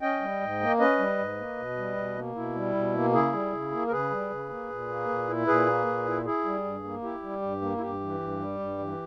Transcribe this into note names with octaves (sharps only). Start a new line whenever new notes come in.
C#4 D#5 G5
G3
G#2
A#3
C#4 B4 D#5
G3
G#2
A#3
B2
G3
B2
A#3
B2 E4
G3
B2
A#3
C#3 E4 G#4
G3
C#3
A#3
A#4
C#3 G#4 B4
G3
C#3
A#3
A#2
A#3
A#2
E4
A#2 G#4 B4
A#3
A#2
E4
E4 G#4
G3
G2
A#3
E4 G4
G3
G2
A#3
E4
G2 G4
E3
G2
G3
G2
E3